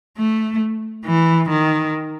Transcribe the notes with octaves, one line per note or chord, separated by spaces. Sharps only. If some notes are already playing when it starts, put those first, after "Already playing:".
A3
E3
D#3